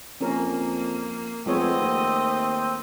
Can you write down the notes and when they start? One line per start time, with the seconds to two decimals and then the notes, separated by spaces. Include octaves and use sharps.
0.21 F2 A#3 C#4 A#4
1.46 F2 G#3 A3 B3 C4 C#5 D#5
1.80 D#2